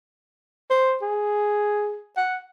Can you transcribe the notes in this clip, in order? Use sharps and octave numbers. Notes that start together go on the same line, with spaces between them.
C5
G#4
F#5